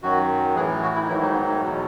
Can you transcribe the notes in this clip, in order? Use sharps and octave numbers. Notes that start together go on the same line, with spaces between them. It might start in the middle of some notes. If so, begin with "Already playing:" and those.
F#2 D#3 F#3 F#4
A2 E3 G#4
F#4
E4
D#4
G#2 D#3 F#3 E4
D#4
B3
A3
E2 B2 F#3